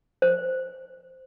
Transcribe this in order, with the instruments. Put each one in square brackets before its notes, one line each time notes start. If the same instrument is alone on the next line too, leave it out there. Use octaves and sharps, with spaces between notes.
[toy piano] C5